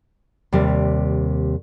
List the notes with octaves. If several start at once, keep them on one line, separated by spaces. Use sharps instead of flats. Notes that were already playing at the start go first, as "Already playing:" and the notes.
D#2 C3 G3